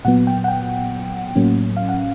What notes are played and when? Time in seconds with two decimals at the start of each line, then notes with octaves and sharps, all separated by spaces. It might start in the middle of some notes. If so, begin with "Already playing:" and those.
0.05 A#2 F#3 B3 F#5
0.27 G5
0.44 F#5
0.48 G5
1.36 A2 F#3 A#3 C#4
1.77 F5
1.89 F#5